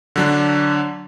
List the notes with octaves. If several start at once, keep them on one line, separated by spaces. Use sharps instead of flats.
D3 F#3 D4